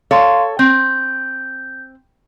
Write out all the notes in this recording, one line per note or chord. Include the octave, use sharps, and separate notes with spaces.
A4 C#5 F5 C6
C4 G6